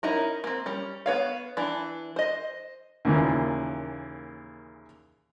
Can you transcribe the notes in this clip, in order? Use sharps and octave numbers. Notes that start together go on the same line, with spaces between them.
C#4 D#4 E4 A#4
A#3 C4
G3 C#4
B3 C#5 F5
E3 D4
C5 D#5
D#2 A#2 C#3 E3